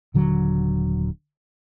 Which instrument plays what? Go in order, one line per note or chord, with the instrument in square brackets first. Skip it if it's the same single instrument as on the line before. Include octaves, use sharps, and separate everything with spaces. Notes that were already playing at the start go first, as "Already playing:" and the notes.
[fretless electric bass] D#1 D3 F#3